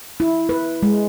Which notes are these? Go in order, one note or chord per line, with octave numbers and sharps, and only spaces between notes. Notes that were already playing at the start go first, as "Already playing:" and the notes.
E4
B4
G#3